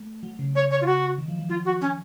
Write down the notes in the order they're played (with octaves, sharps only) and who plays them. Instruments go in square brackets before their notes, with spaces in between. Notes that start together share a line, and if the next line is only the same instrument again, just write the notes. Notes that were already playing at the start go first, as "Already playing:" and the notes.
Already playing: [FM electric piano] A3
F#3
C#3
[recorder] C#5
C#5
F4
F#4
[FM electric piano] D#3
F3
F3
[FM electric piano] F#3 [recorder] F4
[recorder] F#4
C#4